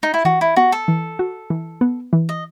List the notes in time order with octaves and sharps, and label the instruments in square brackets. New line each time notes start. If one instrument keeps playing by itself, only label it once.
[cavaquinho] D#4
E4
[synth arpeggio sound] E3 [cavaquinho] F#4
[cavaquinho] E4
[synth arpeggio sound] B3 [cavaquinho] F#4
[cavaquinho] A4
[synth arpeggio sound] E3
F#4
E3
B3
E3
[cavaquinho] D#5